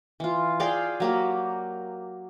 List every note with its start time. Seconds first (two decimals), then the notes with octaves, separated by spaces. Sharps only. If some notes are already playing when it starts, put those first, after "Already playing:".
0.20 E3 F4
0.60 G#4 D5 F5 G5
1.00 F#3 A#3 G4